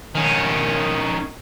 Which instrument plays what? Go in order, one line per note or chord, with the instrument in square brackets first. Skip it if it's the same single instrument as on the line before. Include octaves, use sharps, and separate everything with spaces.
[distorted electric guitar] D#3 C#4